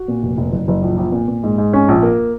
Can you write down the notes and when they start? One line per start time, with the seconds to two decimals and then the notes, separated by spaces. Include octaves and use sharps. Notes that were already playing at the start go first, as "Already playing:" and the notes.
Already playing: F#4
0.08 A#2
0.23 F1
0.38 F1
0.52 F#1
0.68 F#1
0.82 A#1
0.97 A#1
1.12 A#2
1.28 A#2
1.43 G#2
1.58 G#2
1.73 C#4
1.88 A#1
2.03 A#3